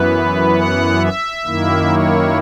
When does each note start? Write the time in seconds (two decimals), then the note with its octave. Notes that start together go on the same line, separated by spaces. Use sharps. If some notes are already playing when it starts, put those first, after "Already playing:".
Already playing: F#2 E3 B3 B4
0.55 F#5
1.00 E5
1.45 F#2 D#3 A#3 E4
1.91 C#5